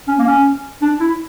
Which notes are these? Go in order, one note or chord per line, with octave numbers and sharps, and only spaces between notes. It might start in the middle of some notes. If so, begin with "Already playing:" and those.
C#4
A#3
C#4
D4
E4